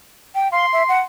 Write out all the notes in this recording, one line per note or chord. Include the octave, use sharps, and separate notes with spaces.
G5
F5 C6
E5
F#5